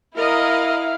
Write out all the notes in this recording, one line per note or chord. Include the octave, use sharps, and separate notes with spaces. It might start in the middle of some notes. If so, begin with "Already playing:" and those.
E4 A#4 D#5 F5